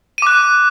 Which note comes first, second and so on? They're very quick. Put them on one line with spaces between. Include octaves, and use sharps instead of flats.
D#7 D6 F#6